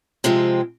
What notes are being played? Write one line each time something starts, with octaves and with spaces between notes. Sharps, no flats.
C3 F3 G#3 C4